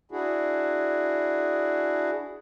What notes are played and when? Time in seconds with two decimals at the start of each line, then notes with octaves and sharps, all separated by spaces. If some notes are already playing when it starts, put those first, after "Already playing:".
0.11 D4 E4 F#4 G#4